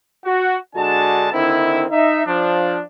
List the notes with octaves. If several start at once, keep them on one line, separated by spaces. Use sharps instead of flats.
F#4
D3 G#3 D4 F#4 A5
D3 D#3 C4 E4
D#4 E5
F3 D4